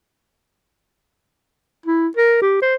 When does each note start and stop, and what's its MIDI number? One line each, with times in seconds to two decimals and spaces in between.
1.86 2.07 64
2.17 2.38 70
2.42 2.59 67
2.62 2.75 72